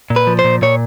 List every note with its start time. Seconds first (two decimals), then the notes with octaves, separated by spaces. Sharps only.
0.10 A#2
0.16 B4
0.27 F3
0.39 C5
0.44 A#2
0.62 A#2 C#5